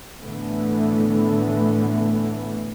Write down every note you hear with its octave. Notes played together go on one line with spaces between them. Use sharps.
A2 D3 E3 A3 B3